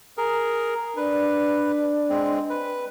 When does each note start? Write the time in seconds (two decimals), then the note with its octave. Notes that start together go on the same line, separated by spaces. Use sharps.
0.17 G#4 A#4
0.97 D4 B4
2.09 G#3 C4
2.50 B4